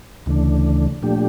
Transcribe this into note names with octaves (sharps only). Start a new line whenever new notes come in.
D2 C#3 E3 A3 D4
A#2 F3 A3 D4 G4